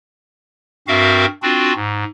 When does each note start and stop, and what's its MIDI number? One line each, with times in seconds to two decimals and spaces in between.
0.88 1.26 43
0.88 1.26 60
0.88 1.26 66
0.88 1.26 70
0.88 1.26 76
0.88 1.26 77
1.43 1.73 60
1.43 1.73 62
1.43 1.73 65
1.43 1.73 66
1.75 2.04 44